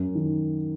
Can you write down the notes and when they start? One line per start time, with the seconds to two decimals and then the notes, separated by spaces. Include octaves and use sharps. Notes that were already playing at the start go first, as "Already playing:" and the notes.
Already playing: F#2
0.15 D#3